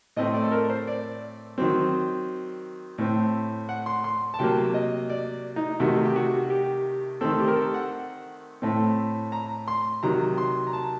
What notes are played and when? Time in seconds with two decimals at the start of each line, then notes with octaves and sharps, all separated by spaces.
0.16 A2 A3 C4 D#5
0.34 D5
0.45 A4
0.52 A#4
0.70 C5
0.87 D5
1.58 D#3 F#3 C4
2.98 A2 A3 C4
3.69 F#5
3.86 C6
4.04 C6
4.34 A5
4.39 C3 F#3 A#3 G5
4.74 D#5
5.10 D5
5.56 D#4
5.80 C3 D#3 A3 F#4
6.05 G4
6.16 F#4
6.50 G4
7.21 D#3 A3 C4 A4
7.39 G4
7.48 A#4
7.56 A4
7.74 F#5
8.62 A2 A3 C4
9.32 A#5
9.68 C6
10.03 C3 D#3 F#3 A#5
10.38 C6
10.67 A#5
10.73 A5